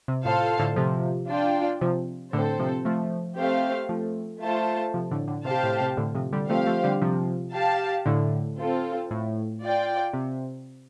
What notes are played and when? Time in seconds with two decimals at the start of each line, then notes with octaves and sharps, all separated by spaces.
0.08 C3
0.25 A2 F4 A4 C5 F5 A5
0.60 A2 D3
0.76 C3 F3
1.29 D4 F4 D5 G5
1.81 C3 F3
2.33 A2 D3 C4 A4 C5
2.59 C3 F3
2.85 F3 A3
3.37 A3 C4 G4 C5 F5
3.89 F3 A3
4.42 A3 F4 C5 A5
4.94 C3 F3
5.11 A2 D3
5.28 A2 D3
5.45 C3 G4 C5 F5 A5
5.63 A2
5.81 C3
5.97 A2 D3
6.15 C3 F3
6.33 D3 G3
6.49 F3 A3 C4 G4 C5 F5
6.67 F3 A3
6.84 D3 G3
7.02 C3 F3
7.54 G4 F5 A5
8.06 A2 D3
8.58 C4 F4 A4
9.11 A2
9.62 F4 D5 G5
10.14 C3